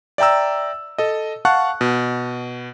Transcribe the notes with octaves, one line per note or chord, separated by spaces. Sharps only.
D5 E5 G5 A#5 E6
A4 D#5
F5 F#5 A5 C#6 F#6
B2